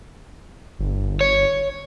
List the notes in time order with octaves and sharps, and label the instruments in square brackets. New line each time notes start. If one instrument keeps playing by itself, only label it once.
[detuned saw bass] G1
[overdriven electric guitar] C#5